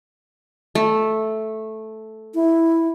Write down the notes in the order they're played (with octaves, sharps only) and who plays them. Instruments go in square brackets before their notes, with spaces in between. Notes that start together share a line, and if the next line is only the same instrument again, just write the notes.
[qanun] A3
[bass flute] E4